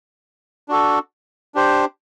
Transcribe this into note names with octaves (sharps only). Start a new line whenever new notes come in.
D4 F#4 A4
D4 G4 C5